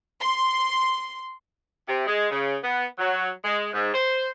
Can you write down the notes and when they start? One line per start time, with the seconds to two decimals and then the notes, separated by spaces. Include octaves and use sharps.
0.22 C6
1.88 C3
2.07 G#3
2.30 C#3
2.64 B3
2.99 F#3
3.44 G#3
3.73 G#2
3.94 C5